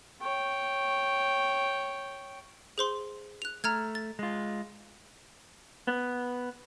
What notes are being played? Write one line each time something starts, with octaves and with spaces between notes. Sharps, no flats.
C#5 G5
G#4 C5 C6
F#6 F7
A3 A#5 F6 G#6
A6
G#3 F4
B3